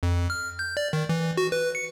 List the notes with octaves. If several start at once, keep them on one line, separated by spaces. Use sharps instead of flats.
F2
F6
G6
D5
D#3
E3
F#4
B4
C#7